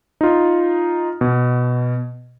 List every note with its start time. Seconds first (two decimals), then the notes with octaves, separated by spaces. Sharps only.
0.21 D#4 F4
1.21 B2